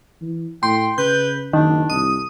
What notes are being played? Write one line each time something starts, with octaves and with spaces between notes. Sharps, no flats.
E3
A2 G5 C6
C#3 B4 G6
F#1 D#3 D4
C2 D#6